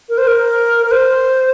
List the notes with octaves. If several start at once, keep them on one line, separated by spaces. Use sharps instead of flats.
A#4
C5
A#4
A#4
C5